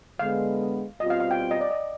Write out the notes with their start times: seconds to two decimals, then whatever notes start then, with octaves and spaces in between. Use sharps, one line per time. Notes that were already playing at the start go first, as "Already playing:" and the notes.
0.19 D3 G#3 B3 F5
1.00 B2 G3 C4 F4 D#5
1.10 F5
1.20 F5
1.31 G5
1.51 D#5
1.61 D5
1.71 D#5